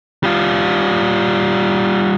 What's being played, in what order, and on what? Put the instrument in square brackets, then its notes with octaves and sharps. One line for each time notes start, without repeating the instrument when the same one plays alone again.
[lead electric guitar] G3 F4